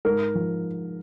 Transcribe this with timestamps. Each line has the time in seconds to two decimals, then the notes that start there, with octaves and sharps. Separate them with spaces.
0.05 G#2 A#4
0.35 F3